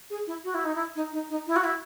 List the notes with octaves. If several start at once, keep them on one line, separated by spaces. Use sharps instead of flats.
G#4
E4
F#4
E4
D#4
E4
D#4
D#4
D#4
E4
F#4
E4